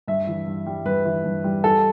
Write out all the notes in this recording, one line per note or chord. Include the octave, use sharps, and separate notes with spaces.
G2 E5
E3
G2
G3
G2 B4
E3
G2
G3
G3 A4